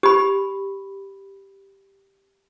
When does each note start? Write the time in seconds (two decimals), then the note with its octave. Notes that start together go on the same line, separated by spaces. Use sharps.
0.03 G4 B5